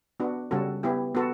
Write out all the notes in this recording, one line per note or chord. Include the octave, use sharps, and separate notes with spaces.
B3 D4 F#4
C#3 G3 C#4 F#4 A4
B3 E4 G4
B3 F#4 A4